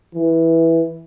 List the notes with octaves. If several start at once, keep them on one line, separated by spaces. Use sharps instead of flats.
E3